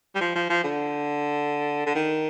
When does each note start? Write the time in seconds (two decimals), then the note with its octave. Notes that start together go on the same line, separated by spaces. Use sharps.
0.15 G3
0.21 F3
0.35 F3
0.50 F3
0.64 D3
1.86 D3
1.95 D#3